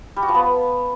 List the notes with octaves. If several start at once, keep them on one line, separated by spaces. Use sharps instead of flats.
G3
F#4
F3
B3